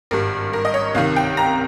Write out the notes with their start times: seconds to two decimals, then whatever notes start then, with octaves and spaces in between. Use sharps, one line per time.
0.11 G#1 G2 G3 A#4
0.53 A#4
0.65 D#5
0.74 C#5
0.95 C2 C3 D#3 F5
1.16 G5
1.37 A#5